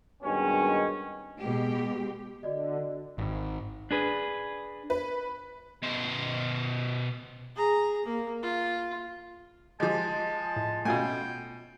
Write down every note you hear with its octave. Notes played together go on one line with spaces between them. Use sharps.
G2 B2 D#3 G#3 C#4
B2 G#3 G4
D3 F#4 D5 D#5
G#1
D4 G#4 B4
B4
B2 C5
G#4 A#5
A#3
F4
F3 G#3 G4 A5
A2
B2 A3 C#4 F4 G5 G#5